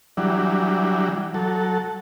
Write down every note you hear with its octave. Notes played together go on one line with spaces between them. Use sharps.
E3 F#3 G3 D4
F#3 A4